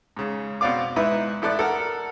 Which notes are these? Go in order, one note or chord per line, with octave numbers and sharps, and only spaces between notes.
G#2 C#3
B2 C4 D5 F5 D6
G#2 D#4 E4 B4 E5
A1 E4 A4 D5 F#6
A4 A#4 F#5 F6